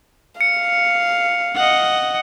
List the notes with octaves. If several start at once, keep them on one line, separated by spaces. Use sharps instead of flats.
F5 C#7
D#5 F#5